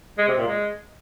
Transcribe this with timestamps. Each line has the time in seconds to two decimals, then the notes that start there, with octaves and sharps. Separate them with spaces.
0.18 G#3
0.28 C3
0.38 A#2
0.47 G#3